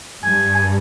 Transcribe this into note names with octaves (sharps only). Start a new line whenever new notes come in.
G2 G#5
G#5